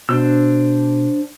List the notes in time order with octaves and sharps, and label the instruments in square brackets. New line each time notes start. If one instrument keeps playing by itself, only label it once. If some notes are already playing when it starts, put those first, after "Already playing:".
[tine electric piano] B2 [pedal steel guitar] D4 C5 E6